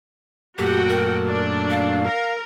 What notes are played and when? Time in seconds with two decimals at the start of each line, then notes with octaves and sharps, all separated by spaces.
0.58 F#2 A#2 A3 F#4 G4 F#5 G5
0.89 A#4
1.24 D4
1.70 F5
2.05 A#4